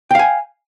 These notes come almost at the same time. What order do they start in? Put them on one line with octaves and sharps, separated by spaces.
G5 F5 G#5